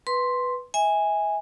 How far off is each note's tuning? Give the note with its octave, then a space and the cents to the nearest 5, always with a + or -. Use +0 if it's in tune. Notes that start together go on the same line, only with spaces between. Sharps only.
B4 +0 C6 +0
E5 -30 G#5 -10